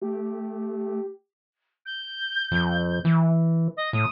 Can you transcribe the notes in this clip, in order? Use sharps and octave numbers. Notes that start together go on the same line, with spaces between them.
A3 G4
G6
F2
E3
D#5
A2 D#6